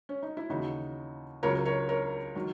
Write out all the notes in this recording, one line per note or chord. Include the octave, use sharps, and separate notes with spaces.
C#4
D#4
E4
D#2 C#3 E3 D#4 F#4
C#2 C#3 F#3 A#4 C#5
A#4 C#5
A#4 C#5
D#3 F#3